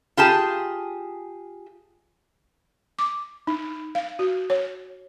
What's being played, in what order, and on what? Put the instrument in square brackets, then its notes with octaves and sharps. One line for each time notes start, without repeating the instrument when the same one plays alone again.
[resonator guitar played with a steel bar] F4 G4 G#4 A5
[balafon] D6
D#4
F5
F#4
C#5